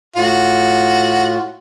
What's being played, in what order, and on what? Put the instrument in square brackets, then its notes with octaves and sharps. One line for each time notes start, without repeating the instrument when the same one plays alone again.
[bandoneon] A2 F4 [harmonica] F#4